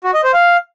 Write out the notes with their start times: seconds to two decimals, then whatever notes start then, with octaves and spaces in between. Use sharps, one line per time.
0.04 F#4
0.14 D#5
0.24 C5
0.34 F5